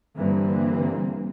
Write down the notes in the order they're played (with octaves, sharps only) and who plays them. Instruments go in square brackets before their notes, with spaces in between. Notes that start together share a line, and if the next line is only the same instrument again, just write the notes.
[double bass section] G2 D3 E3 A#3 C4